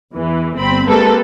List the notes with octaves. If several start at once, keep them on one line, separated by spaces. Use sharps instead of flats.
E2 E3
G1 C4 B5
G#3 A#3 C4 G4 A4 B4